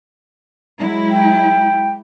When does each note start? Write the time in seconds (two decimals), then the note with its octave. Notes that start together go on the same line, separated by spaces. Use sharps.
0.80 F#3 G#3 E4
1.10 G5